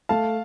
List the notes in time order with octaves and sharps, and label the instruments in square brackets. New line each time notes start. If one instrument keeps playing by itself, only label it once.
[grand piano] A3 [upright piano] F5 A5